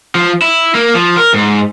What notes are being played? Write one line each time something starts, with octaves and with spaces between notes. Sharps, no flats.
F3
E4
A#3
F3
A#4
G#2